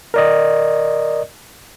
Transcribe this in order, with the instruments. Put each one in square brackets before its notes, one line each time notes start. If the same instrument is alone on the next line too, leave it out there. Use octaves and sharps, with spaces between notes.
[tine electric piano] A#4 D5 D#5